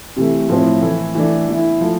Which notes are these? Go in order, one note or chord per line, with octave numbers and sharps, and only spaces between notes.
C3 E3 A3
A2 F3 A3 C4 E4
E3 A3 E4
E3 A3 D4
E3 B3 E4
F3 A3